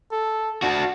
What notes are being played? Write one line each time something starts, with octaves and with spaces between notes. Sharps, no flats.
A4
D4 F#4 A5